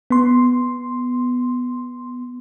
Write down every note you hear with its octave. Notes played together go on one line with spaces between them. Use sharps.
B3 C6